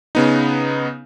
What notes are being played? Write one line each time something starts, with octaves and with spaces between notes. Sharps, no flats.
C#3 B3 D#4